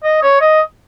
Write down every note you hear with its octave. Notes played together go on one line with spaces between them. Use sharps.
D#5
C#5
D#5